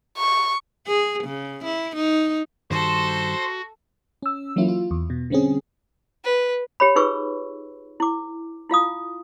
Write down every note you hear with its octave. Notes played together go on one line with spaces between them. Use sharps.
C#6
G#4
C#3
E4
D#4
G2 D#3 G3 F#4 A4 C5
C#4 E6
E3 F#3 A#3 C#4 E4 F4
F4
E2
B2
D3 G3 C4 C#4 G#4
B4
G4 C#5 B5
D#4 F4 G#4 B4 C#6 E6
E4 D6
E4 F4 F5 D#6